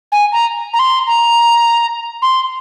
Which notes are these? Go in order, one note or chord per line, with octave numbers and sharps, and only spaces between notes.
G#5
A#5
A#5
C6
A#5
C6